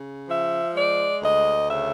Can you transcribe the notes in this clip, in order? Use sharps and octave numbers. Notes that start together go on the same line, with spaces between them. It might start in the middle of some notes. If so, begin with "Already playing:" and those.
Already playing: C#3
F3 E5
G#3 D5
D2 D#5
C#3 E5